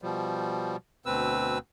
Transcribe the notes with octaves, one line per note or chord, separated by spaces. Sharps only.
B2 F3 G3
D2 B2 C4 B4 E6